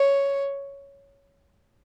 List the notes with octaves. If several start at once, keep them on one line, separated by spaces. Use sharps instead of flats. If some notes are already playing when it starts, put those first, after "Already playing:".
Already playing: C#5